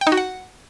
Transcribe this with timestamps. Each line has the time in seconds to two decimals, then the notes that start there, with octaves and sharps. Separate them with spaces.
0.01 G5
0.07 D#4
0.12 F#4
0.17 F#5